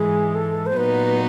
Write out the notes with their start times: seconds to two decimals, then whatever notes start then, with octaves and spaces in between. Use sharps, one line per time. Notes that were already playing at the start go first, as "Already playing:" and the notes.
Already playing: G#2 E3 G#3 G#4
0.35 A4
0.66 C5
0.77 A#2 F#3 B3 D#4 F#4 B4